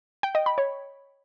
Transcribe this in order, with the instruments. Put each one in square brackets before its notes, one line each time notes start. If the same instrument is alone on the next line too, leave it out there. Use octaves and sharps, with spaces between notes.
[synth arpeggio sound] G5
D#5
B5
C#5